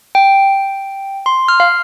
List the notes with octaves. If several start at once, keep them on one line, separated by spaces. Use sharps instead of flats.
G5
C6
F6
F5